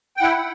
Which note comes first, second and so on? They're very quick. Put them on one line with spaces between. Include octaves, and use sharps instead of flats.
G5 F#5 E4